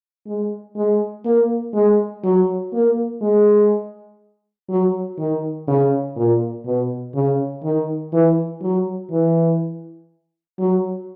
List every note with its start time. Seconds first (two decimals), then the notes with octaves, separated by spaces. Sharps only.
0.27 G#3
0.77 G#3
1.25 A#3
1.74 G#3
2.24 F#3
2.73 A#3
3.22 G#3
4.69 F#3
5.18 D#3
5.68 C#3
6.16 A#2
6.65 B2
7.14 C#3
7.64 D#3
8.13 E3
8.62 F#3
9.11 E3
10.59 F#3